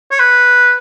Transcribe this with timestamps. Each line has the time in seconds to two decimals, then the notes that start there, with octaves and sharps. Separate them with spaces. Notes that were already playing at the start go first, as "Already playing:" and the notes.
0.11 C#5
0.20 B4